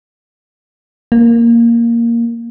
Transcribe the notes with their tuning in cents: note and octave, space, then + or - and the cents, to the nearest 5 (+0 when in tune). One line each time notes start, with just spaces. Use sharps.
A#3 +0